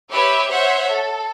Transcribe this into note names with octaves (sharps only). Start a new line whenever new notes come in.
G4 B4 C#5 E5
C5 C#5 E5 F#5
A4